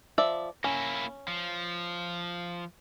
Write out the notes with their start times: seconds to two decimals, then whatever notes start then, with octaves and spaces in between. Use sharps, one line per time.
0.18 F3 D5 E5
0.64 A#3 C#4 E4
1.28 F3